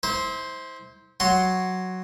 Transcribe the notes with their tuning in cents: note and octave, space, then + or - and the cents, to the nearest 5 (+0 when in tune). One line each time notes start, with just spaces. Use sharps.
E4 -35 C5 +0
F#3 +0 F#5 +0 C6 +5